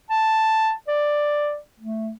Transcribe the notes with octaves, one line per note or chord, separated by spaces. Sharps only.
A5
D5
A3